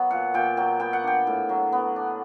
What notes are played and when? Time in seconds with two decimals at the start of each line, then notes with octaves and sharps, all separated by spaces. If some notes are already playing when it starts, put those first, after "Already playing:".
Already playing: F#3 B3
0.11 A#2 F#5
0.34 A#2 G5
0.57 F#3 G5
0.80 B3 G5
0.93 F#5
1.04 D4 G5
1.27 A2
1.49 F#3
1.72 B3
1.96 D4